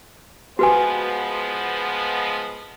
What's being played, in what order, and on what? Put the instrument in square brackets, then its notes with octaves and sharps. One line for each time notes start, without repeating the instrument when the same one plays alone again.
[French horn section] F3 G#3 B3 [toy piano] F#4 B4 G#5